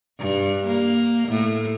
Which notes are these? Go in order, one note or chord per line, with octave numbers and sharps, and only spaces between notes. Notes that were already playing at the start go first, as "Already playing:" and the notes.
G2
A#3
A2